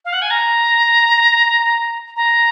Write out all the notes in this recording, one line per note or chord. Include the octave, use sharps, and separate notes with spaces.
F5
F#5
G#5
A#5
A#5